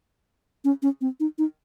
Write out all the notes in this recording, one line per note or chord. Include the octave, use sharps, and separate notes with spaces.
C#4
C#4
C4
D#4
D#4